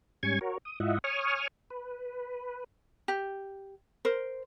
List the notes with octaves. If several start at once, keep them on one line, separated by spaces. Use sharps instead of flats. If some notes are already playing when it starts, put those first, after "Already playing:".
G#2 G3 C#4 G#5 C#6 G#6
F#4 A#4 C#5
D#6
G#2 E4 F4 D#5 E5 F#5
C#5 G#5 C#6 D#6 F6
B4
G4
A#4 C5